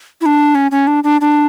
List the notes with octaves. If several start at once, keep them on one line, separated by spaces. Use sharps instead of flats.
E4
D4
C#4
C#4
D4
D4
D4